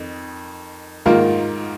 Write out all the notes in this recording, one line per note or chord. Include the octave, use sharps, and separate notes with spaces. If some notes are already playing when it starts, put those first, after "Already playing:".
Already playing: F2 D#3
G#2 D#3 A#3 F4 A#4